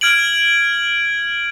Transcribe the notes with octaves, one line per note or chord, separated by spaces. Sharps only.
F6 G#6 D7 F#7